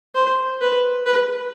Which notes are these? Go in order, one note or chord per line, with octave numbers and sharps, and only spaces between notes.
C5
B4
B4